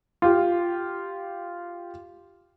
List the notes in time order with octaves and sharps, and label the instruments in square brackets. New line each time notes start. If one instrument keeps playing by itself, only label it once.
[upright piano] F4 G4